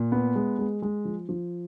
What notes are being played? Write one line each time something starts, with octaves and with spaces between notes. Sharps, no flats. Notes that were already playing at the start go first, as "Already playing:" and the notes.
Already playing: A#2
B3
G#3
G#3
G#3
F3
F3